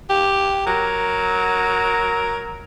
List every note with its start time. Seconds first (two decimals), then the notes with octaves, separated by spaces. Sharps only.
0.10 G4
0.67 F#3 A#4